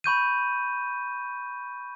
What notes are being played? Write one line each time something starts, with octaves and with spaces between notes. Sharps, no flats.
B5 C#6 G6 D#7